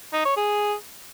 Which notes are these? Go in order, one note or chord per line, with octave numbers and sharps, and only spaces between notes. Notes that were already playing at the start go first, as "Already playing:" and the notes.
D#4
C#5
G#4